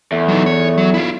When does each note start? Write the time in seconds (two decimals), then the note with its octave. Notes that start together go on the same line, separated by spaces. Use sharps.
0.12 E2 A3
0.28 F#3 D#4
0.46 C#5
0.78 F#3
0.94 E4 F4